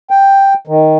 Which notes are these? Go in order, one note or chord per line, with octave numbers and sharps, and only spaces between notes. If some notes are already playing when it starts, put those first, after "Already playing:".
G5
D#3